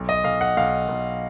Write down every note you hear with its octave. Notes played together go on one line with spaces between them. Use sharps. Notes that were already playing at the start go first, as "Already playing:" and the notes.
Already playing: B1
D#5
B1 F5
F#5
B1 F5
B1